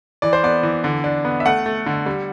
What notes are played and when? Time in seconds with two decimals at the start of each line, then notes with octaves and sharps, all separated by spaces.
0.22 E3 D5
0.33 C5
0.43 B3 D5
0.63 E3
0.84 D3
1.04 D4
1.25 B3
1.40 E5
1.46 A3 F#5
1.66 A3
1.86 D3
2.06 G3